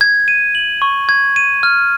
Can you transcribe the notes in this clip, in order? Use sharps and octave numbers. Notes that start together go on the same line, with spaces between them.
G#6
D#7
F#7
C#6
G#6
D#7
F6